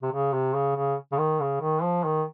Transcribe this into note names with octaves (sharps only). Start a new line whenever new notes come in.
C3
C#3
C3
C#3
C#3
C#3
D#3
C#3
D#3
F3
D#3